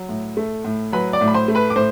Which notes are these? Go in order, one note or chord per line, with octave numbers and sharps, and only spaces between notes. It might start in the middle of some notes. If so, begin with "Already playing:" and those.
Already playing: F#3
A2
A3
A2
F#3 B4 B5
D5 D6
A2
B5
C5 C6
A3
B4 B5
D6
A2 C5